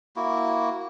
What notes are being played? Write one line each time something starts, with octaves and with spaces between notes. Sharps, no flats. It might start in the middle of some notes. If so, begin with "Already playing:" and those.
A#3 E4 F#4